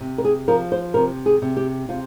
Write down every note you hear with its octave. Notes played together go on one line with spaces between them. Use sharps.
C3
A#4
G#4
F3 A#4
C5
C3 A#4
G#4
C3
G4
C3 F4